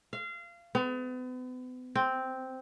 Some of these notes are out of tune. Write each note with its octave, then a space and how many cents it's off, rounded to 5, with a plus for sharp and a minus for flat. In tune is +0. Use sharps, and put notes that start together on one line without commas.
F5 -25
B3 +40
C4 -5